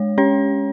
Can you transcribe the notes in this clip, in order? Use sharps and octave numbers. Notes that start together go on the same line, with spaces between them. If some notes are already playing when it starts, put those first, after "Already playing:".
Already playing: G#3 C#5
C#4 C#5